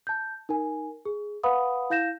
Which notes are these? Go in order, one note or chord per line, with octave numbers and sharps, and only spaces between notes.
A5 G6
D#4 A#4 G#5
G#4
B4 F5 F#5 B5 D#6
E4 F5 G6 A#6 E7